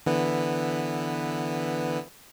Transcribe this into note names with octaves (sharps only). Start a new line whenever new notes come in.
D3 E3 B3